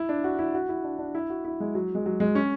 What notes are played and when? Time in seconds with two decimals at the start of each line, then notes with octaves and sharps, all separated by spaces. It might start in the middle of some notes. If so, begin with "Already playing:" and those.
Already playing: E4
0.09 D4
0.24 F#4
0.39 E4
0.54 F#4
0.69 E4
0.84 D4
0.99 D4
1.15 E4
1.30 F#4
1.45 E4
1.60 G#3
1.75 F#3
1.95 G#3
2.06 F#3
2.20 G#3
2.35 C#4